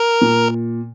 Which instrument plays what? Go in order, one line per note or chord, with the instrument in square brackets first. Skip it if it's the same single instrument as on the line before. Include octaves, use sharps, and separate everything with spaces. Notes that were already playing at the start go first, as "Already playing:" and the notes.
Already playing: [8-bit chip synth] A#4
[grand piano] A#2